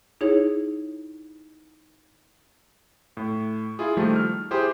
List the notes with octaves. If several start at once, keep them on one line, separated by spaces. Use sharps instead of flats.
D#4 E4 G#4 C#5
A2
E4 F4 G#4
D#3 F3 G3 A3 A#3
F6
E4 G4 G#4 C5